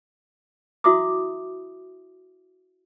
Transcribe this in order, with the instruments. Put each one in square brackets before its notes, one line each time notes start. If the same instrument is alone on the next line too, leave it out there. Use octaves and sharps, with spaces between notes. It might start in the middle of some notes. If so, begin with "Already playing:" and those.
[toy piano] E4 F#4 E5 C6 D6 D#6